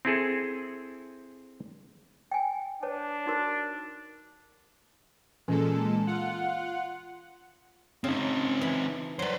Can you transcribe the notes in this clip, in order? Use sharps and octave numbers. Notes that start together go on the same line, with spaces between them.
C4 E4 G#4 A4
G5 G#5
D4 B4 C#5 A5
D#4 F#4 A#4
A#2 E3 G#3 C#4 A4
F4 F#5
C#3 C4 D#4
E3 B5
F#3 G3 B4 C5